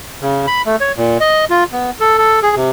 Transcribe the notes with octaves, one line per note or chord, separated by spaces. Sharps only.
C#3
B5
A3
C#5
A#2
D#5
F4
B3
A4
A4
G#4
C3